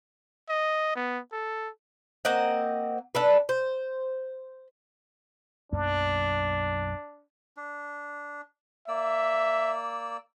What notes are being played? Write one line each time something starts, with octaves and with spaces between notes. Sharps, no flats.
D#5
B3
A4
A#3 C4 D#5 F#5
D4 A4 B4
C5
B1 F#2 A#3 D4
D4
A#3 D5 E5 E6